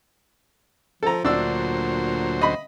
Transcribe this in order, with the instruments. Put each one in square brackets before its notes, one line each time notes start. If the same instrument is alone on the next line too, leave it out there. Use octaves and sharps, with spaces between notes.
[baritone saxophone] F3 [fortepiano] A4 A#5
[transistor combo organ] D2 F#3 C5 [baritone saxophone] A#2 [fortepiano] D4 E6
[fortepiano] D#5 B5